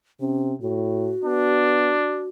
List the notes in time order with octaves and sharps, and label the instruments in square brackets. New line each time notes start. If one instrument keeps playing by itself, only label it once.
[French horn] C3 [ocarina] C#4
[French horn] A2 [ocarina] F#4
[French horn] B3 [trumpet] D4